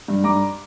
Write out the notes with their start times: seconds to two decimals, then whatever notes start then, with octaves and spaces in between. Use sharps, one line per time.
0.08 G2
0.24 G2 A#5 D6